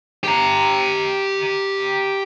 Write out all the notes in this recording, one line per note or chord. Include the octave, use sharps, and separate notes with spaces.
G4 A#5